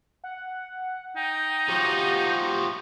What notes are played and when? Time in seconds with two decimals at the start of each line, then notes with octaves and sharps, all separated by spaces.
0.24 F#5
1.16 D#4 G5
1.68 F3 F#4 G4